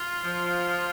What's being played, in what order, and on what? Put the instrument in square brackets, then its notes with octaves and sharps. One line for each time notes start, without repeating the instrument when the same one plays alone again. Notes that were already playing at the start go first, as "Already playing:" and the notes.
Already playing: [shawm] F4
[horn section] F3